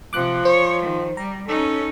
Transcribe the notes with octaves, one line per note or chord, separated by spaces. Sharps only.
C3 F3 D6 F#6
C5 C#5
D#3
G3 A#5
C#4 D#4 A4